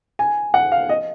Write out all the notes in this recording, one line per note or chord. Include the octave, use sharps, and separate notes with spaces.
G#5
F#5
F5
D#5